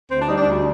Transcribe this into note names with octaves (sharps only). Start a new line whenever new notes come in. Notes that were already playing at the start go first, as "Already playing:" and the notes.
D2 C4
D4
G3 D#4
D4
D2